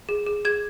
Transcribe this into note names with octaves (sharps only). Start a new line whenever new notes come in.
G#4
G#4
G#4 G#6